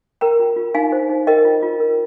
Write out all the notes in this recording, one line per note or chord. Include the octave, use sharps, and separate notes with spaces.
A#4 G5 A#5
F4
F4
D#4 F5 G#5
C5
D#4
A#4 D#5 G5
F4
F4
A#4